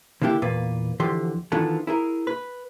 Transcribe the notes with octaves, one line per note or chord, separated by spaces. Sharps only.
D3 A#3 D4 E4 G4
E2 A#2 A#3 B4 D5
D2 D3 E3 F3 G4 C6
D#3 E3 B3 D4 F4 A4
E4 G#4 A#4
B4